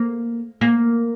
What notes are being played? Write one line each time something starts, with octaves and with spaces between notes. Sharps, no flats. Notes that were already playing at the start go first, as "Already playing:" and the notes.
Already playing: A#3
A#3